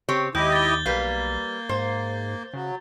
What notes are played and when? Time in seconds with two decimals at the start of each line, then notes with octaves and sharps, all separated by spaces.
0.09 C#3 C4 G4 C#5
0.35 D#2 G#3 E4 G4 D#5 G6
0.52 A6 G7
0.86 B1 G3 A#3 B4 F5 G6
1.69 G#2 C5
2.54 C#3 F#3